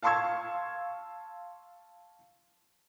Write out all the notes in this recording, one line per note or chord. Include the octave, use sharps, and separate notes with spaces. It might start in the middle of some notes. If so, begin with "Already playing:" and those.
F5 A5 C6 C#6 E6 G#6